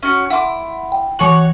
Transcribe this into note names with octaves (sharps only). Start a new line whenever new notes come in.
C#4 F#4
E4 F#5 C6 D6
G5
E3 F#4 C#5 F#7